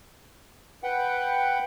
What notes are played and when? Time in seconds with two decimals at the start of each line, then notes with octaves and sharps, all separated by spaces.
0.83 B4 F#5 G5